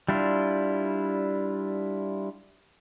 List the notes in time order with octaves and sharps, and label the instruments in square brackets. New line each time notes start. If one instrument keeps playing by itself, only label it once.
[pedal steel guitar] G3 D4 E4 F4